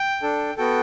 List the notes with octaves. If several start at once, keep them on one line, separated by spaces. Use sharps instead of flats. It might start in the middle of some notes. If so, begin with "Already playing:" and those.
Already playing: G5
D4 A4
B3 F#4 A4 G5